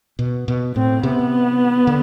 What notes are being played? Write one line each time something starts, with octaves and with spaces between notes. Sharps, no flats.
B2
B2
A2 C4
C3 B3
D3